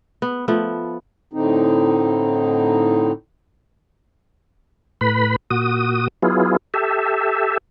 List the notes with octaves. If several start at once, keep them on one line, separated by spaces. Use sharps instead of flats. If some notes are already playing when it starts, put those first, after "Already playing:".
B3
F3 A3 B3
A2 D3 C4 D#4
A2 B4 B5
A#2 F#4 D#6
F#3 B3 E4 F4 G#4
G4 A4 E5